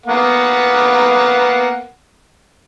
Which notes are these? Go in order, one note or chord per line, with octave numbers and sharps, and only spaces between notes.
A#3 B3 F#5